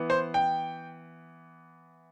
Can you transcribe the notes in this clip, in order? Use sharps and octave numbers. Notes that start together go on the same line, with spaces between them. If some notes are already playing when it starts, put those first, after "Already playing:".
Already playing: E3 B3
C5
G5